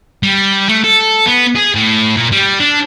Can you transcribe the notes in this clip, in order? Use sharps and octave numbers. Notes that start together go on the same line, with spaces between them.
G3
A3
A4
B3
G#4
A2
A#2
G3
D4